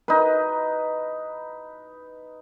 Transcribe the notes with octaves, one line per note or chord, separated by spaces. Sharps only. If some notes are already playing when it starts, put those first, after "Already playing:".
D#4 B4